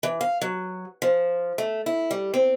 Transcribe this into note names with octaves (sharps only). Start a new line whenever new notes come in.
E3
F5
F#3
F3
A3
E4
G3
C4